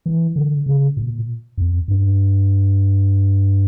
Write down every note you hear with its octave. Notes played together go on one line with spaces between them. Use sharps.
E3
D3
C#3
A#2
F2
G2